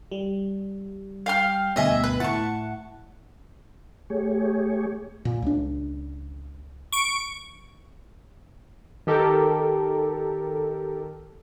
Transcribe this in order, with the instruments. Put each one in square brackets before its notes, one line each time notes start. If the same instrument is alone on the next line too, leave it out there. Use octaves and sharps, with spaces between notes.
[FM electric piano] G3
[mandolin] F5 G5 F6
[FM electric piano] D2 G2 B2 [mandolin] D#5 E5 G#5
[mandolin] B4
[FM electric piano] A2 E4 F#5 [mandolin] A5 C#6
[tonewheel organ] A3 G4 G#4 C#5
[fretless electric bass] A#2
C#2 D4
[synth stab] C#6 D7
[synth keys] D#3 G4 A4 A#4